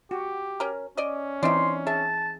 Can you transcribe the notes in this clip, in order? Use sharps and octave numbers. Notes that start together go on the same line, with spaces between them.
F#4 G4
C#4 A#4
C#4 D5 D#5
E3 C4 D#4 D5 E5 C6
G#4 E5 A5